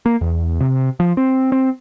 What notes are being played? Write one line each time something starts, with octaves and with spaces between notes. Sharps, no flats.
A#3
E2
C3
F3
C4
C4